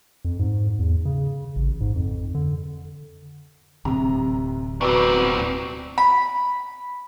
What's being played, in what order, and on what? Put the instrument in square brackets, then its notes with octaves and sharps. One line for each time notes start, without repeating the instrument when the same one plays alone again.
[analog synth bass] F2
G#2
E2
C#3
A1
G#2
F2
D3
[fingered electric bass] D1 [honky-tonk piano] C3 A#5
[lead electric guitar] B2 C4 [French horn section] F#4 B4 [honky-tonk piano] D5 A#5 D6
[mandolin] B5